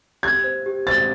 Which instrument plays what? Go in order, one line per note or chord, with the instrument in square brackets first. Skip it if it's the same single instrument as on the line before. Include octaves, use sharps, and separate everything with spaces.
[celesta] G4 [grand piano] G#6
[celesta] C5
G4
[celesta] C5 [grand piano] A6